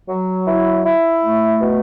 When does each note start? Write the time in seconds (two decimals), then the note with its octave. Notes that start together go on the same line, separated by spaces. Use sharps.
0.08 F#3
0.46 E4
0.84 E4
1.22 A3
1.61 B2